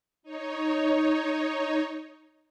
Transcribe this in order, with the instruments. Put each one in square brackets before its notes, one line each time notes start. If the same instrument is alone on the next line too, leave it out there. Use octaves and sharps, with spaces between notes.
[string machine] D#4 C#5